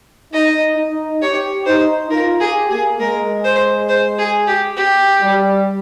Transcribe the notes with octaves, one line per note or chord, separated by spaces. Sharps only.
D#4 D#5
D#4
G4 C#5
D#4 C5
F4 A#4
G4 G#4
A#3 G#4
G#3 A#4
C5
C5
G#4
G4
G4
G3